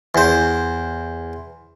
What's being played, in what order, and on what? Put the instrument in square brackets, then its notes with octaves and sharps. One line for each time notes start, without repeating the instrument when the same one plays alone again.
[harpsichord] E2 C5